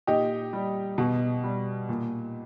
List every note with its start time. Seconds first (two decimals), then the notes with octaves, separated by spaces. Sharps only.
0.07 A#2 D#4 G4
0.53 G3
0.98 B2
1.44 G3
1.89 A#2